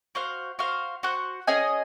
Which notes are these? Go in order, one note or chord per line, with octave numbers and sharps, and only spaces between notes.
F#4 C5 F5
F#4 C5 F5
F#4 C5 F#5
C#4 G#4 D#5 G#5